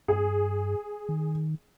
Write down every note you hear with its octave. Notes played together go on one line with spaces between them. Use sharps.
G2 G#4
D#3